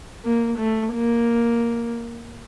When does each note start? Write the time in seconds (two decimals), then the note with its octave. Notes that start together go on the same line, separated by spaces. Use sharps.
0.25 A#3
0.58 A3
0.93 A#3